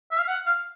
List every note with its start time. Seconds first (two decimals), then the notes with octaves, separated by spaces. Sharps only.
0.12 E5
0.20 F5
0.28 F#5
0.46 F5